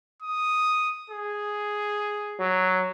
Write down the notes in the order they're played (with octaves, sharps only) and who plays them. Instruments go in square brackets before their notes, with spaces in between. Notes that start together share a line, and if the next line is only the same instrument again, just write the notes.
[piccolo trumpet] D#6
G#4
[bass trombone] F#3